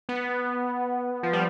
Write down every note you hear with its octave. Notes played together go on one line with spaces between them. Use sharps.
B3
F3
G3